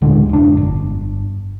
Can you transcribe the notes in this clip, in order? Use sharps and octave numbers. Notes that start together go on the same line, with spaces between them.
D1 D3 G#3
F1 D4
G1